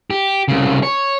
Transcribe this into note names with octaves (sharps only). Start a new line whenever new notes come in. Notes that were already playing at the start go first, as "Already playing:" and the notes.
G4
C2 C#3
C#5